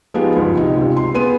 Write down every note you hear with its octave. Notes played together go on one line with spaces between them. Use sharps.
F3 G#3 B3 D#4 F4 G4
G1 C#2
C3 D#4
C#2 C3
C6
B3 G#4 D#7